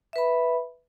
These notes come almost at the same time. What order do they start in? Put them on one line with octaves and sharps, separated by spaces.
E5 B4 B5